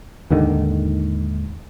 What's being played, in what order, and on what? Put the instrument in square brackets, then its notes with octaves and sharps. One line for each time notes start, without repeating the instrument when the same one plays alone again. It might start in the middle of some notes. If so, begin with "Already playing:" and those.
[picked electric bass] D#2 G#2 D3 D#3